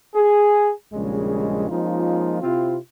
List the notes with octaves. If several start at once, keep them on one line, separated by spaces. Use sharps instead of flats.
G#4
A#1 D#2 C#3 G3 G#3
F3 G#3 A#3 C#4 D#4 F4
C3 C4 E4 F4